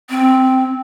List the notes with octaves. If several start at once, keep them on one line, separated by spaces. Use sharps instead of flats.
C4